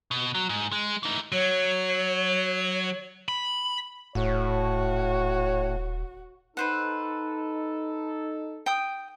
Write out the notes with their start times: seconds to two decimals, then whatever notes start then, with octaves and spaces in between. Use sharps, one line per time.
0.11 B2
0.35 F#3
0.49 G#2
0.72 G#3
1.03 E3 D#4
1.32 F#3 C#5
3.28 B5
4.15 D#1 A2 F#4 C#5
6.57 D#4 A4 B4 C5 F#5
8.66 G5 D#6